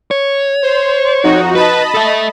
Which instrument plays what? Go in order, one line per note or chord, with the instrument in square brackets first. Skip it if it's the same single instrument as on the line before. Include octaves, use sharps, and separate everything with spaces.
[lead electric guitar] C#5
[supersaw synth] C5
F2 D#4 F#4
[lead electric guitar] B4 [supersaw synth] D#5 A5 B5
[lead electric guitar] A4 E5